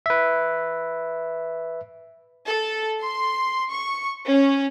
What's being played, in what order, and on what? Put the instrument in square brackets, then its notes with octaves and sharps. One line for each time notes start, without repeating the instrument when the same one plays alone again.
[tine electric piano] B4 E5
[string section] A4
C6
C#6
C#4